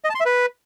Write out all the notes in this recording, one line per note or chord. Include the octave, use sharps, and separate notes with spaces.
D#5
A5
C6
E5
B4